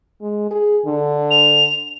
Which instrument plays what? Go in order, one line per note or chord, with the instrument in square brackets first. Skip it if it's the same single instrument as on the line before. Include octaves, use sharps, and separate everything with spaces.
[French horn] G#3
G#4
D3
[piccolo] F7